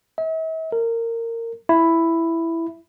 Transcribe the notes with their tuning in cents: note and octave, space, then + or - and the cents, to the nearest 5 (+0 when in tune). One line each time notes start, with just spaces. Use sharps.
E5 -45
A#4 -20
E4 +5